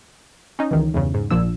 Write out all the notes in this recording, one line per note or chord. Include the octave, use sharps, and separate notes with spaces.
C#4 D#4
C#2 D#3 E3
E2 G2 C#3
G#2
A#1 A#2 F3 D4 E6